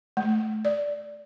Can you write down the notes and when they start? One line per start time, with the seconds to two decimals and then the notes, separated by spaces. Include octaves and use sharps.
0.17 A3
0.65 D5